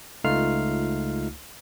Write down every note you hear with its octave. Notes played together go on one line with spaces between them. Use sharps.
C#2 A3 D#4 F4 F6 C7